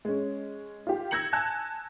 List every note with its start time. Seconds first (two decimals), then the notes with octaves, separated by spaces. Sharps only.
0.05 G#3 C#4
0.87 F4 G4
1.11 E6 G6 G#6 A#6 C#7 F#7
1.33 G#5 A5 F#6 G#6